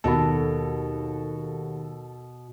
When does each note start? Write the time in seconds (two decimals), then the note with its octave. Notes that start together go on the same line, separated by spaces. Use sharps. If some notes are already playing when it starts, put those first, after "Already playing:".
0.04 D#2 B2 F#4 A4 B5